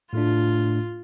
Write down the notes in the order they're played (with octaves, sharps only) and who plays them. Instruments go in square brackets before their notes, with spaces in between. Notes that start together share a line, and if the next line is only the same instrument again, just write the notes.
[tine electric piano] A2 A3 D4 [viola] F4